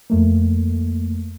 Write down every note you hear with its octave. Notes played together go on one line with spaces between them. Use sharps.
F2 A3 A#3